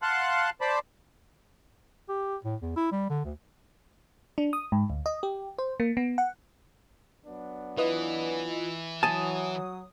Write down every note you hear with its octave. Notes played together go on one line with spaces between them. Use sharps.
F5 F#5 A5 C6 F#6
C5 D5 A5 B5
G4
A2
E2
E4
G3
D3
D2
D4
D#6
G#2
D2
D#5
G4
C5
A#3
B3
F#5
F#3 B3 D4
E3 F4 B4 D#5
F#3 G#5 A5 D#6